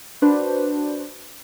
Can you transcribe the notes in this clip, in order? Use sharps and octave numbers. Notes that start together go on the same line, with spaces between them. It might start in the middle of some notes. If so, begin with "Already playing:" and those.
D4 F#4 B4 C5